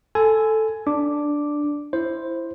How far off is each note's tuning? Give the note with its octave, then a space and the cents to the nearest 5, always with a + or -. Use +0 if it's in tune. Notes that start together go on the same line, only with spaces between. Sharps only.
A4 +0 G#5 +10 C6 -40
D4 +0 D6 +0
E4 +10 C5 +5